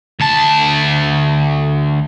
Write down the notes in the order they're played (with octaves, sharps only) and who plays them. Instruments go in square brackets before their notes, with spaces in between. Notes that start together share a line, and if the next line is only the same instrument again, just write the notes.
[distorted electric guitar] D2 A5